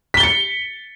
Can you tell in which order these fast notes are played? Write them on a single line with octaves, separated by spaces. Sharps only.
B6 G7 A6 C#7